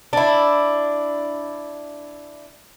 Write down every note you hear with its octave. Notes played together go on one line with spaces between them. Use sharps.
D4 E4